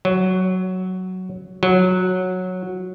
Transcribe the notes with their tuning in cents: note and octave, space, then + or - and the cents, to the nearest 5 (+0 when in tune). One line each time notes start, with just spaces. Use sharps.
F#3 +5
F#3 -10